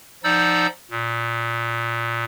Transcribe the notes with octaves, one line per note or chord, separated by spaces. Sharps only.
F3 D#4 D5 F#5 E6 G6
A#2